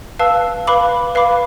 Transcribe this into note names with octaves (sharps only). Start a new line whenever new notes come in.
B4 F5 A5 E6
B4 F5 B5 D6
B4 F5 B5 D6